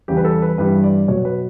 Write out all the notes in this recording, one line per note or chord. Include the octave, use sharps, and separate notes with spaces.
E2 C#3 G3 G4
B4
A4
B4
G2 E3 G3 B4
D5
B2 F#3 C#5
B4